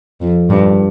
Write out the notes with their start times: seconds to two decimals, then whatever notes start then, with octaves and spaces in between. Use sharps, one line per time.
0.21 F2
0.50 G2